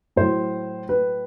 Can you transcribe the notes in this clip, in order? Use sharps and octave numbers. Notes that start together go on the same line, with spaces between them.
A2 F#3 C5
B4